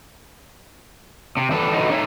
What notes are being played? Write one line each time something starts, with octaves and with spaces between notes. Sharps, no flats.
C3
E3 G3 D4 A4
D3 E3 F#3 D#4
D#4 C#5 D5 E5